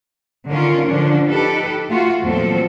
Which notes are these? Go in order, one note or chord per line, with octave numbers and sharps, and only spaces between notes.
D3 D#3 C#4 F4 A#4
D3 F3 C#4 D4
D#4 G4 A4 B4
A3 F4 F#4
E2 A#2 F3 F#3 C4 A4